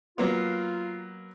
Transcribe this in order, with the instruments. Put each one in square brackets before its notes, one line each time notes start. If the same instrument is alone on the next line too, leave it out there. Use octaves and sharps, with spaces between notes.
[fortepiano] F#3 A#3 B3 [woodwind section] F4